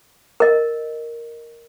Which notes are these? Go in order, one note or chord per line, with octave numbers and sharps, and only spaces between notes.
A#4 D#5